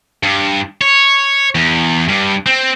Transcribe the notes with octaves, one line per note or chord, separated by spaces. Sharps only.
G2
C#5
E2
G2
C4